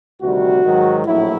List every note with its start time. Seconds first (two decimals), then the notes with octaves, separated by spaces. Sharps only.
0.21 D2 C3 D#3 G3 F#4
0.63 G#2 D#3 F#3
1.06 A#1 A2 F#3 E4